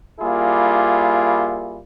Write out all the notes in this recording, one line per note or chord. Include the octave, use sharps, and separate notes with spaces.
G3 A#3 E4 F4 G#4